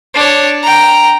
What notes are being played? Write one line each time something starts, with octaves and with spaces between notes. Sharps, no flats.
D4 C#5
G5 A#5